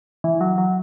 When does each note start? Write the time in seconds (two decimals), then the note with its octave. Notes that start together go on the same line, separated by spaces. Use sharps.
0.24 E3
0.41 F#3
0.58 F#3